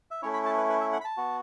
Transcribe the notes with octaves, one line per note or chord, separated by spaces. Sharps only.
E5
A3 C#4 E4 C#5
B5
A5
B4
B4
E5
F#5
B5
A5
B3 F#4